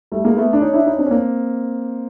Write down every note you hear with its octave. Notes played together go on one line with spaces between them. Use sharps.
G3 A3
G#3 A#3
A3 B3
D4
C#4 D#4
D4 E4
C#4 D#4
C4 D4
C#4
A#3 C4